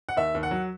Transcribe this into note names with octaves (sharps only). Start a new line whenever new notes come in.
F#5
D#2 E5
D#2
F#5
F#3